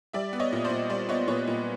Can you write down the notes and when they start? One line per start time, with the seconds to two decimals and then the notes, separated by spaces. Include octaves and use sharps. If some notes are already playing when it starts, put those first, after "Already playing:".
0.13 G3 D5 E5
0.33 B3
0.40 C#5 D#5
0.53 A#2
0.65 C5 D5
0.70 A#2
0.90 G3 C5 D5
1.09 B3 C#5 D#5
1.28 A#2 B4 C#5
1.47 A#2